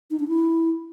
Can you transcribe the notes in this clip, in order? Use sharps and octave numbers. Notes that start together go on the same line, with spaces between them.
D#4
D4
E4